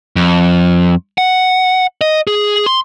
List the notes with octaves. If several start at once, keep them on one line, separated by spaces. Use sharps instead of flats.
F2
F#5
D#5
G#4
C6